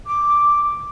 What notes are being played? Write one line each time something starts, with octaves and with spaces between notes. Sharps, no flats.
D6